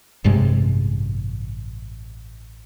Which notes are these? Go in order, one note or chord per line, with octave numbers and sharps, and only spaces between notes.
A1 G2 C3 G#3